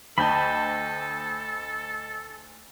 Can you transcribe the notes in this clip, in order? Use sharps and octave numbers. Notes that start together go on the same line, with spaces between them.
D2 A4 D#5 G5 A5 B5